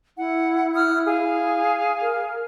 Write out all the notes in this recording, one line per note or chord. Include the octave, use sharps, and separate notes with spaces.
E4 F#5
D#6 F6 F#6
G#4 F5
A#4